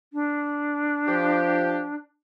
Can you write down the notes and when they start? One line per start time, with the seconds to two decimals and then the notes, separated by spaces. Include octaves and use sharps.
0.13 D4
1.07 F3 G4